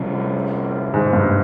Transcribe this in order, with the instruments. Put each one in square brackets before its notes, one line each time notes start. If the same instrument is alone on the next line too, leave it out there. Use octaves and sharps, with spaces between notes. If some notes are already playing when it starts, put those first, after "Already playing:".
Already playing: [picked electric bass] C3 G3 C#4
[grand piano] G#2
G2